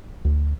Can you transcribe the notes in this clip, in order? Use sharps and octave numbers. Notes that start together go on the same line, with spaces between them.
D2